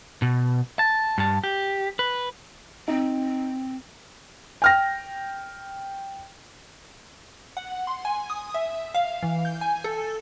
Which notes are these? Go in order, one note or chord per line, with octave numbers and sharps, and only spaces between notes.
B2
A5
G2 A5
G4
B4
C4 D#4
G5 F6 A#6
F#5
C6
G#5
D#6
E5
F5
E3
G6
G#5
A4